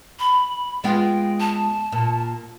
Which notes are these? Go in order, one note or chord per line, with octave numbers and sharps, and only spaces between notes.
B5
G#3 B3 F4 G5
A5
A#2